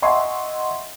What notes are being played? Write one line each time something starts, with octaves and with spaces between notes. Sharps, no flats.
D#5 E5 F#5 G#5 C6 C#6